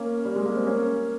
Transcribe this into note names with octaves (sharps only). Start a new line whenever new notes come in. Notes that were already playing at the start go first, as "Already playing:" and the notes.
Already playing: A#3 C#4
G3
G#3
A#3
C4
A#3 C#4